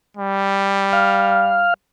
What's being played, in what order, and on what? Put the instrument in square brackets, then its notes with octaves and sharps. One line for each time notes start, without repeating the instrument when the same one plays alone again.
[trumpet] G3
[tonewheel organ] F5